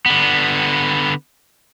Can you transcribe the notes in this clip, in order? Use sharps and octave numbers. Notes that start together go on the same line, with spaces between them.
D3 B3